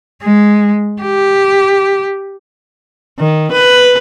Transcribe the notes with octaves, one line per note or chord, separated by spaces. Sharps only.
G#3
G4
D#3
B4